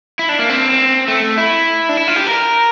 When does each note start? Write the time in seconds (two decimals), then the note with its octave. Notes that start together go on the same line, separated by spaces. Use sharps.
0.19 E4
0.29 D4
0.39 A#3
0.50 C4
1.08 A3
1.38 E4
1.89 D4
1.97 E4
2.07 F4
2.16 G4
2.27 A#4